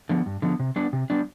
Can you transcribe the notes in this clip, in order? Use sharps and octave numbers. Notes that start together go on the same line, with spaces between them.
D3 F3 B3
G2
D3 F3 B3
C3
G3 B3 D4
C3
G3 B3 D4